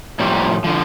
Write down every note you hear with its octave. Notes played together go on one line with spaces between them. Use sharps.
A2 F3 G3 A#3
D3 F3